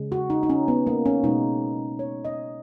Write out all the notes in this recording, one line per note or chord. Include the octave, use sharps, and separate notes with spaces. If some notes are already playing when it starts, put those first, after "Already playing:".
Already playing: C#3 G#3
F#4
D#4
D#4
C#4
B3
A#3
C#4
B2 G#3 D#4
C#5
D#5